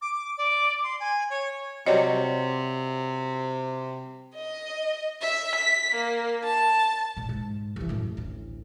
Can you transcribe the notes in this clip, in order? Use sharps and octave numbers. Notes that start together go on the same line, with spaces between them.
D6
D5
C6
G#5
C#5
C3 F#3 G3 C#5 D#5
D#5
E5
B6
A#3
A5
A#2
G#2
C2 E3
F#2 A2
A1 D2